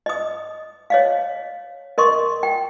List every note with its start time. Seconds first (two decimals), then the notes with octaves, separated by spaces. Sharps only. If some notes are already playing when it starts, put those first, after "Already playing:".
0.06 D#5 D#6
0.90 C#5 D#5 F5
1.98 A#4 D#5 C6 C#6
2.43 G5